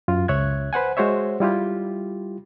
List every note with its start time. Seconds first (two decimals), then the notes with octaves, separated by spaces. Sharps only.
0.08 F#2 F4
0.28 C#2 C#5 E5 F#6 G#6
0.73 B4 C5 F#5 G#5
0.97 G#3 F#4 C5 C#5 E5
1.40 G3 E4 F4 G4